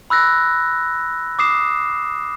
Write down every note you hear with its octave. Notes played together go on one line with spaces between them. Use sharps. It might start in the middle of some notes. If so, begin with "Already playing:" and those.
B5 E6 F#6 A#6
D6 D#6 C7 E7